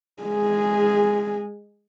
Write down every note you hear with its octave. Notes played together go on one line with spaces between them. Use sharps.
G#3 G#4